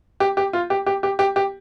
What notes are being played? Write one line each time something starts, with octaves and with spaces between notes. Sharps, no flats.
G4
G4
F4
G4
G4
G4
G4
G4